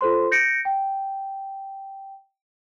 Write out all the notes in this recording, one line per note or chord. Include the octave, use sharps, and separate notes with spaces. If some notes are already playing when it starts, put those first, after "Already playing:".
F4 A4 C5 C6
G6 A#6 C#7 D7
G5